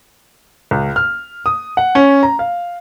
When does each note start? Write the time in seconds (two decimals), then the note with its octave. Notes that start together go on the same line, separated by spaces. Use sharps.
0.71 C#2
0.96 F6
1.46 D#6
1.77 F#5
1.95 C#4
2.23 A#5
2.39 F5